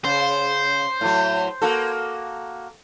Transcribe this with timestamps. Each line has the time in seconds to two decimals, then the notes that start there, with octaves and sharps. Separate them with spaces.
0.05 C#3 C5
1.01 A2 F#3
1.62 A#3 F#4 A4